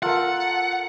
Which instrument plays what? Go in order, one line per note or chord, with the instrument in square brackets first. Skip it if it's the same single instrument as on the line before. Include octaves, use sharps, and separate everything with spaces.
[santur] F4 A4 A#4 [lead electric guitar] F#5